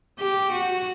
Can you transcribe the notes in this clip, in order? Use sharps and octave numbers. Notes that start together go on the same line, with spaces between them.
G4
F#4